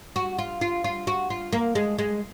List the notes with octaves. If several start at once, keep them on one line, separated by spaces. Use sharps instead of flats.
F#4
F4
F4
F4
F#4
F4
A#3
G#3
G#3